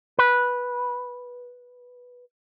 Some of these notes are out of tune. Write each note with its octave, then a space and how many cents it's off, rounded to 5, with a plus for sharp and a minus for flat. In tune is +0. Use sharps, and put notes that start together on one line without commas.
B4 -10